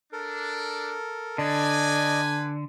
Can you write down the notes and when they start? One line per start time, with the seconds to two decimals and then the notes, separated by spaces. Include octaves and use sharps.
0.13 D4 A4 A#4
1.38 D3 B4 D5 D#5 G#5 A5